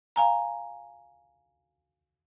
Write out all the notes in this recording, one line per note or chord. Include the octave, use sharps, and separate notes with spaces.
F5 G#5 A#5